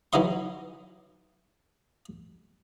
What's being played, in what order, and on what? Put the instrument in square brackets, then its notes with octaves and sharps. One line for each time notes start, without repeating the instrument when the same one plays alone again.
[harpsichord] E3 F#3 D#4 D#5 C6